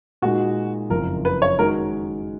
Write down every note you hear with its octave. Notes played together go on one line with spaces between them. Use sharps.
A#2 G#3 D#4 F#4
F#1 F2 F3 A#4
B4
C#5
D#3 G#3 D#4 F#4 A#4